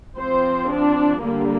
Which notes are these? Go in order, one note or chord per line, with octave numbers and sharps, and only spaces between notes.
F3 C4 C5
D4
D3 G3 A#3 D4